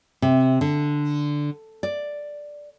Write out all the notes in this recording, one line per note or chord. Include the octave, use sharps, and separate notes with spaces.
C3
D3
D5